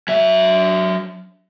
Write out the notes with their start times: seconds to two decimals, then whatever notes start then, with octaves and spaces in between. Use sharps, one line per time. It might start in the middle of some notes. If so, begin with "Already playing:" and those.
0.08 F#3 E5